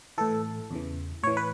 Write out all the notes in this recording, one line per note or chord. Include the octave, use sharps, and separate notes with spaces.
A2 E3 A4
E2 C#3 E3
A2 E3 C#5
B4